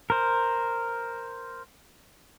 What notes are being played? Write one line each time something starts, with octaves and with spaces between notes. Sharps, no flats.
A#4 C5